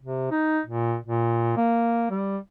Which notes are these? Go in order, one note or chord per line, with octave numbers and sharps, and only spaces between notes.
C3
D#4
A#2
A#2
A#3
G3